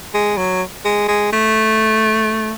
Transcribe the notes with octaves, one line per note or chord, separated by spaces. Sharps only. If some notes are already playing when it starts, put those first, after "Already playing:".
G#3
F#3
G#3
G#3
A3